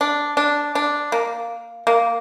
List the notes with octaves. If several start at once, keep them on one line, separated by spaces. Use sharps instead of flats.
D4
D4
D4
A#3
A#3